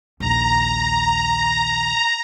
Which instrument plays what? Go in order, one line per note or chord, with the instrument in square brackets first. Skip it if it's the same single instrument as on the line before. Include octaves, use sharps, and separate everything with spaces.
[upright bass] A#1 D#2 [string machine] A#5